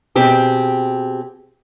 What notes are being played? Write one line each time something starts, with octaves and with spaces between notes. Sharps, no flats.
B2 C4 G4 G#4